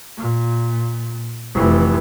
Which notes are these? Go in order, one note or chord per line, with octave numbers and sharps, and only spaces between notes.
A#2
F1 E3